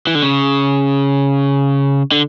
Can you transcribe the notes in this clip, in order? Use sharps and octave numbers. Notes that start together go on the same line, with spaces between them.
E3
D3
C#3
D3